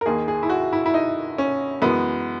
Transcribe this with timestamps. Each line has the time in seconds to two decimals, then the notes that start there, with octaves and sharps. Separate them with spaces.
0.01 A#4
0.06 D#2 D#3 A#3 G#4
0.28 G#4
0.43 E4
0.50 F#4
0.73 E4
0.86 E4
0.94 D#4
1.38 C#4
1.82 F#2 E3 G#3 B3